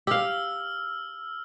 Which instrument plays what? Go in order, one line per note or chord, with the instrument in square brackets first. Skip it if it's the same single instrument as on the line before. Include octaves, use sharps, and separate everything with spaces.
[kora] G4 F5 [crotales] E6 F6